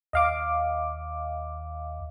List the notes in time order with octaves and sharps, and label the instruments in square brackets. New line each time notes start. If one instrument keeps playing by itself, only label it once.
[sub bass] D#2 [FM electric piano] D#5 F5 D6